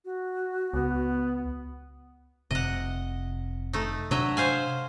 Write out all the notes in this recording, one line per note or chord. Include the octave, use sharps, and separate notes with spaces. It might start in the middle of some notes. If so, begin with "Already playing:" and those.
F#4
C#2 B3
F1 C3 D#5 F#5
A3 D#4
C3 F#3 D4 D#5 E5
C5 F5 G#5